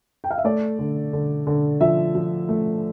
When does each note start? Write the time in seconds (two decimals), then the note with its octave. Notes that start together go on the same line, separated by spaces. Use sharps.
0.24 G5
0.30 F5
0.38 E5
0.44 A3 D5
0.79 D3
1.13 D3
1.47 D3
1.81 F3 E5
2.15 F3
2.49 A3